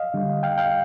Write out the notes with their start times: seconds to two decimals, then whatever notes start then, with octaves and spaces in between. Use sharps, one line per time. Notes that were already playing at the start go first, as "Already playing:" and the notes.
Already playing: D#5 F5
0.14 D3 G3
0.43 F5 G5
0.58 F5 G5